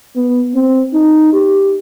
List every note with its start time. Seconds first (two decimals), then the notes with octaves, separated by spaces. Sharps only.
0.16 B3
0.55 C4
0.93 D#4
1.33 G4